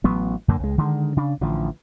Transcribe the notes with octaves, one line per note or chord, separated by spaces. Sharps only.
A1 F#3 B3
F#2 D3 A#3
C#2 G#3
D3 D#3 G#3
C#3 D4
A1 D3 F3